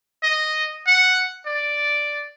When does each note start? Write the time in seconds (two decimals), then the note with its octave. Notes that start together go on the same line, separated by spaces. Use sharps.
0.23 D#5
0.87 F#5
1.46 D5